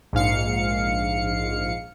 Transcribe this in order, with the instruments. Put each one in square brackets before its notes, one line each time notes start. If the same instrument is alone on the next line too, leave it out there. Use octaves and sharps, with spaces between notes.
[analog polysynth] A#1 G#2 F5 C#7